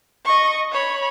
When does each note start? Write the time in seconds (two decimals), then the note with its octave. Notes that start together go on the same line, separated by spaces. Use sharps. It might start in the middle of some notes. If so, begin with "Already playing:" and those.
0.25 D#5 C#6
0.72 C#5 B5